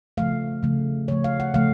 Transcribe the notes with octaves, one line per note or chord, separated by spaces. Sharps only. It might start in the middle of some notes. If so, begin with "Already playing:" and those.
C#3 F3 A3 F5
C#3 F3 A3
C#3 F3 A3 C#5
F5
F#5
C#3 F3 A3 F5